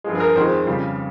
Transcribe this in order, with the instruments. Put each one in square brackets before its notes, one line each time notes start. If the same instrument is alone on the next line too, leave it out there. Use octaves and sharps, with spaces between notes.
[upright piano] G2 F3 G#3
G#4
A#4
F2 D#3 G#3 C5
F2 C#3 G3